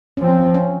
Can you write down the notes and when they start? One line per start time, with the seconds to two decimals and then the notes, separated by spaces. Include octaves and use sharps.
0.17 F3 C4 C#4
0.54 C#4